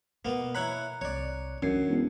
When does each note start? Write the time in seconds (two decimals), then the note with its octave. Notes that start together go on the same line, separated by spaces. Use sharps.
0.25 B2 A#3 B3
0.55 E4 C#5 A#5 B5 F#6
1.01 C2 C#5 D5
1.62 F#2 E3 C#4 D4 C7
1.88 E1